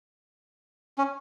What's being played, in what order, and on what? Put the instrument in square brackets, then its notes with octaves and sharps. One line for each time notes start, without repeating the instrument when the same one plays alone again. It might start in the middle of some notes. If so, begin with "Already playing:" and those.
[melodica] C#4